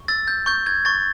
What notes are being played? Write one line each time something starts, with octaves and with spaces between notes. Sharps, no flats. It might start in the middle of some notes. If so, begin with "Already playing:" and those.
Already playing: C#6
E6 A6
G6
C#6 G6
G#6
C#6 A6